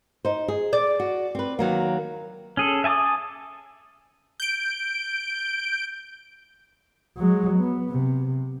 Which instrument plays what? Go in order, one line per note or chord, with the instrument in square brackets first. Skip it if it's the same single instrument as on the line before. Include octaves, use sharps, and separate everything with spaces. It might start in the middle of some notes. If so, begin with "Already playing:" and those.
[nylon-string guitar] D#4 C5
G#4
[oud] D5
[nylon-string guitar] F#4
C4 B4
D#3 F#3 A#3
[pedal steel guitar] C#4 G#4 A4
E5 G#5 A5 D6 D#6
[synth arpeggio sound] G6 D7
[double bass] F#3 G#3
B3
C3